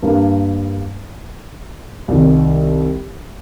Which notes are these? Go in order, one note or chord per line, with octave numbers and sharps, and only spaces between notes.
G2 G3 A#3
C2 C3 D#3